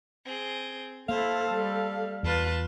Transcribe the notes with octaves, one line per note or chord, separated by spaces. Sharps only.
C4 G#4
A#3 E4 A4 C5 F5
G3
E2 F4 B4 A5